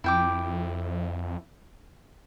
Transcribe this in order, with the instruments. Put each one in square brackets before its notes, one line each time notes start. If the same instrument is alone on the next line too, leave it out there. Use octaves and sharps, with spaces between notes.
[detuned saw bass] F2 [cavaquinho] E4 G5 D6